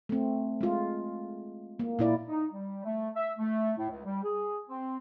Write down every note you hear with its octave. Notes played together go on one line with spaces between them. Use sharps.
A3 C4
G#3 F4
A#3
A#2 E4 D5
D#4
G3
A3
E5
A3
A2
C#2
G3
G#4
C4